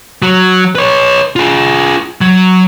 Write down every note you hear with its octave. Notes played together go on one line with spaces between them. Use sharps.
F#3
B4 C#5
F4 G#4
F#3